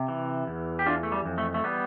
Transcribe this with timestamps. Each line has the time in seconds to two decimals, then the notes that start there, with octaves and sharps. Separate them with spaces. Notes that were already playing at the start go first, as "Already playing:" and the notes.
Already playing: C3
0.08 E3
0.47 E2
0.79 G4
0.86 E3 D4 F4
1.03 A3
1.12 G3
1.25 F2
1.38 A3
1.54 A3
1.64 G3 B3